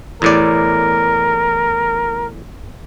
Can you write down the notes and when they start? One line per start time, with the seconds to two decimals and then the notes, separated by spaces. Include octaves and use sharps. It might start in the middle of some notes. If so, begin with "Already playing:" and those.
0.22 E2 A2 A#4 D5